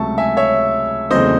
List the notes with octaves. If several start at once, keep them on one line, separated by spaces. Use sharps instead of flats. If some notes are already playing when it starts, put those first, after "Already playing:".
Already playing: C#2 C3 F#3 A3 E5 A5 C#6
E5 G#5
C#5 E5
E2 C#3 F#3 A3 C4 C5 D#5